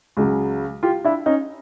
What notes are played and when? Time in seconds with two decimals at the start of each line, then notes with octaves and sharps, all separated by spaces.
0.17 C#2 C#3 F#3
0.83 F4 G4
1.04 D4 E4
1.26 C#4 D#4